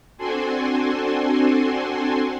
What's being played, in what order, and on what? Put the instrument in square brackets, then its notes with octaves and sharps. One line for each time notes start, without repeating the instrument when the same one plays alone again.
[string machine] C4 D4 F#4 A4 G#5 C6